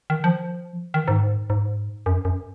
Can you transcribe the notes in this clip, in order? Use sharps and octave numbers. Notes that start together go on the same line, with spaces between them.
D#3
F3
D#3
G#2
G#2
F#2
F#2